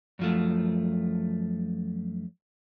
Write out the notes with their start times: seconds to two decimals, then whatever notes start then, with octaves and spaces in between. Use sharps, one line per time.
0.19 F#2 F3 A3